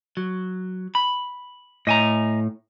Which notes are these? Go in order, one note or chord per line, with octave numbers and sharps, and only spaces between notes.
F#3
B5
A2 D#5 G#5 A#5